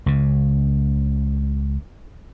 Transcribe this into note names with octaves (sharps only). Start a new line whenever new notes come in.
C#2 C#3